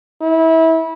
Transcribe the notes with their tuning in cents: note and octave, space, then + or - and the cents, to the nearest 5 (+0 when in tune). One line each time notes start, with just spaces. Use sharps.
E4 -25